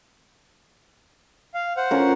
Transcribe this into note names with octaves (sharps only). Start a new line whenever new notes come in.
F5
C5 F#5
C#4 F4 A#4